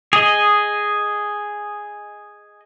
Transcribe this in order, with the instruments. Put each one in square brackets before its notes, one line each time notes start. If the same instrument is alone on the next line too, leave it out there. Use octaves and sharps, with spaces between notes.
[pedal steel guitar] G#4 D#5